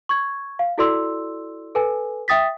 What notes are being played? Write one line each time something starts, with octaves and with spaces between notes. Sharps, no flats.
C#6 G#6
F5
E4 F#4 A4 D5 C6 E6
A4 B4 G#5
E5 G5 D#6 A6 B6